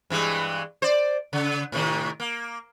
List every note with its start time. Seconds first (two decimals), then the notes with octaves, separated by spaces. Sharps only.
0.10 G2 E3 G#3
0.82 C5 D5
1.33 C#3
1.72 A2 C3 D#3
2.20 A#3